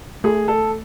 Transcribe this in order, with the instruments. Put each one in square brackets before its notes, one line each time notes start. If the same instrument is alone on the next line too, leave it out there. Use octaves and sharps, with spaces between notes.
[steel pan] A3 [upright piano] G#4
[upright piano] A4